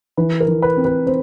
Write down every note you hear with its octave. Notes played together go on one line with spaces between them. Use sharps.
E3 B4
A#4
E3
B4
C4
B4
C4 C5